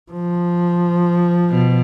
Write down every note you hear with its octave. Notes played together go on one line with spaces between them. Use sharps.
F3
B2